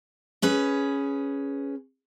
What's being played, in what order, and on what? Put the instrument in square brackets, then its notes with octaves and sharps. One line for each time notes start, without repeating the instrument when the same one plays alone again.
[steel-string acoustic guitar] C#4 G#4 B4